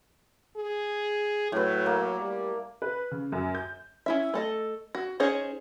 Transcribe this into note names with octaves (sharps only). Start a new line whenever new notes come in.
G#4
A2 F#3 B4
A#3
G3
B4
C#3
F#2
G6
C#4 E4 E5
A3 A4 D#5
F#4
C#4 D#4 G#4 C5 C#5